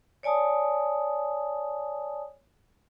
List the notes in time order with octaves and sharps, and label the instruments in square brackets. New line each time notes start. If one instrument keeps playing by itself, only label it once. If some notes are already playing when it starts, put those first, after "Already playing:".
[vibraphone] C#5 D5 G#5 A5 D#6